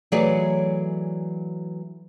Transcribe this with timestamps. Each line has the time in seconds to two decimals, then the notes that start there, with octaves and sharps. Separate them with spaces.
0.12 E3 F#3 A3 G#4 C#5 D5